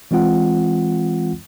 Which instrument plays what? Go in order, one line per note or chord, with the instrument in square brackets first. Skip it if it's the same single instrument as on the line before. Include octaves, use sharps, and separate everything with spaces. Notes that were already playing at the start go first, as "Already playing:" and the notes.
[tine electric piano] E3 G#3 C4 F4 F#5